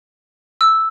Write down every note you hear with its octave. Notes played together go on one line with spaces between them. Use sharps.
E6